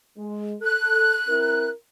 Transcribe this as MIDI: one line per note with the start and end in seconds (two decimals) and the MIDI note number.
0.18 0.55 56
0.62 1.23 69
0.62 1.68 90
1.29 1.69 60
1.29 1.69 64
1.29 1.69 70